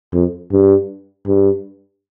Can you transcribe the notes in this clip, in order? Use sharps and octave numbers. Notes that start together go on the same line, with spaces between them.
F2
G2
G2